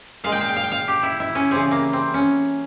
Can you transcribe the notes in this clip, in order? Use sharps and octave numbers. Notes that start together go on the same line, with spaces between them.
A#2 G#3 F5
G5
F5
G5
F5
G5
F5
G4
E4
E4
C#4
C#3 E3 G3 C4
A#3
C4
C#4